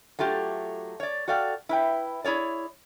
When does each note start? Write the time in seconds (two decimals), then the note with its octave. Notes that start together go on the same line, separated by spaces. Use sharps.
0.19 F#3 A3 F4 G4
1.00 C#5 D5
1.28 F#4 A4 D5 F5 G5
1.69 E4 B4 G5
2.24 E4 G#4 C#5 D5